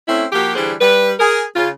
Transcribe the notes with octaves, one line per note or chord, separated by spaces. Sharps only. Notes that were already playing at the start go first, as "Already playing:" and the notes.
A3 C4 C#4 E4
F3 A#3 F#4 G4
D3 E3 G3 D4 G#4 C5
G3 B4
G#4 A#4
C#3 F4